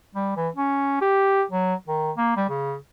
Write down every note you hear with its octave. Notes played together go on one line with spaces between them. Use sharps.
G3
E3
C#4
G4
F#3
D#3
A#3
G3
C#3